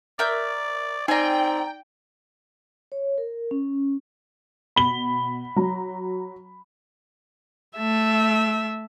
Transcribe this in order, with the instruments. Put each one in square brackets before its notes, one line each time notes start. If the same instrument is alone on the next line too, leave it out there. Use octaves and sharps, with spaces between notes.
[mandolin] A#4 E5 G6 [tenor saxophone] D5
[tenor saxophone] C4 [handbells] D#4 D5 [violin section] G5 [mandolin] G#5 A#5
[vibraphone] C#5
A#4
C#4
[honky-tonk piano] B2 [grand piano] B5 G7
[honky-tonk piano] F#3 A#5
[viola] A3 E5